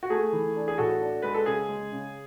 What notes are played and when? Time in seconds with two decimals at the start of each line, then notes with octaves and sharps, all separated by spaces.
0.03 F#4
0.10 A3 G#4
0.33 E3
0.56 D4
0.68 G#4
0.78 A2 F#4 A4
1.01 D4
1.22 G#3 B4
1.34 A4
1.46 C#3 G#4
1.69 G#3
1.92 C#3